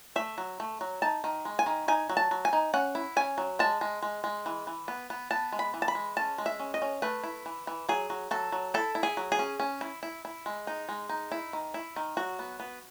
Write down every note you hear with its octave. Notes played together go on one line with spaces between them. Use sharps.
A3 E5
F#3
A3
F#3
D#4 A5
D#3
G#3
G#5
D#3
D#4 G#5
F#3
A5
F#3
G#5
D#4
C#4 F#5
E4
C#4 G#5
F#3
G#3 A5
G#3
G#3
G#3
E3
E3
B3
B3
B3 A5
G#3
B5
E3
A5
B5
G#3
C#4 A5
G#3
E5
C#4
D#5
C#4
A3 B4
E4
E3
E3
F#3 G#4
F#3
F#3 A4
F#3
E4 A4
E4
G#4
F#3
G#4
C#4
C#4
E4
E4
E4
G#3
D#4
G#3
D#4
E4
D#3
E4
D#3
F#3 F#4
B3
B3